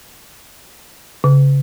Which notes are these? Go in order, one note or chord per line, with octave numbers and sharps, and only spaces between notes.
C#3